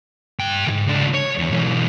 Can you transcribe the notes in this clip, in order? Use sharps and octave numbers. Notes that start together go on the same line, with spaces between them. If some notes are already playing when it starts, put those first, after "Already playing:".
G2 G5
C2 G#2
C#2 D4
C#5
E2
B1 E3